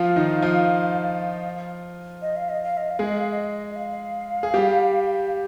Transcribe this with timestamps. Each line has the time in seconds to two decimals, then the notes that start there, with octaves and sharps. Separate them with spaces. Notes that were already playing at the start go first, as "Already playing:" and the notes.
Already playing: F3 F4 F5
0.16 D#3 D#4
0.42 F3 F4
2.22 D#5
2.36 F5
2.49 D#5
2.64 F5
2.77 D#5
2.90 F5
2.99 G#3 G#4
3.05 D#5
3.18 F5
3.32 D#5
3.70 D#5
3.76 F5
4.43 G#4
4.54 G3 G4